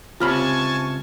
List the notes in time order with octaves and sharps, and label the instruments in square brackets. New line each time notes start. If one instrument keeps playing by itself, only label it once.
[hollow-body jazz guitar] C#2 C3 B5 [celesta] F4 F6 [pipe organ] G#5 A5 C#6